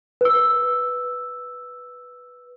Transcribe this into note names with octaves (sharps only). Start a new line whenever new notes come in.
B4 E6